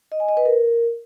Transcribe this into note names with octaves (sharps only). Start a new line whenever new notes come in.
D#5
G#5
D#5
B4
A#4